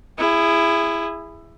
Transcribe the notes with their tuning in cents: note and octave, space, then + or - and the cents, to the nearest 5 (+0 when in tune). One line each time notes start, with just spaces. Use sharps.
E4 +15 G#4 -20